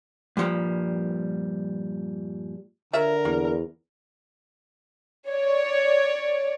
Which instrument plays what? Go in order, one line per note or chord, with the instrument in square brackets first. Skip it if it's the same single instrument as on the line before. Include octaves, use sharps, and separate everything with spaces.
[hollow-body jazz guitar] G2 A#2 F3 G3
[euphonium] D3 [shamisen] F4 C#5 E5 [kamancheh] A#4
[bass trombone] E2 [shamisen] A#3
[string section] C#5 D5